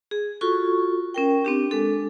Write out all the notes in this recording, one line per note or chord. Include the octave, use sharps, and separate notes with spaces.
G#4
F4 F#4 A4 C#6
C#4 A#4 G5
C4 D4 G4
G#3 D4 A4